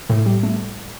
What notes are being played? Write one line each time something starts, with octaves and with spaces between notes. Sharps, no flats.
A2
G3
A3